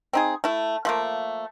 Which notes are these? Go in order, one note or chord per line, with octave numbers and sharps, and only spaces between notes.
C4 D#4 G#4
A3 E4
F3 A3 A#3